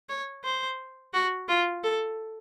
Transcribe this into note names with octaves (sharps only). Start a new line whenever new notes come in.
C#5
C5
F#4
F4
A4